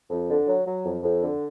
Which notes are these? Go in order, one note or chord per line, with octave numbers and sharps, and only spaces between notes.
F2
D3
F#3
F#3
F2
F2
D3